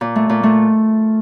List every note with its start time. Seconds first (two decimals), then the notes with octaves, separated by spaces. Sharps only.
0.01 A#2
0.16 A3
0.30 A#2
0.43 A3